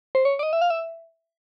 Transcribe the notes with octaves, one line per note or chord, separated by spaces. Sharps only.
C5
C#5
D5
D#5
E5
F5
E5